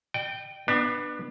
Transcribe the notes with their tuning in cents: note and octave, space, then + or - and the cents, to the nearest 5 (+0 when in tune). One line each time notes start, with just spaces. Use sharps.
D5 +45 G5 -10
B3 -10 D4 +25